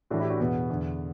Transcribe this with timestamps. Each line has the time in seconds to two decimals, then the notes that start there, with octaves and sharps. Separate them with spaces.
0.10 A2 E3 D4 F#4
0.20 E4 G4
0.30 D4 F#4
0.39 E2 B2 B3
0.70 E2 D3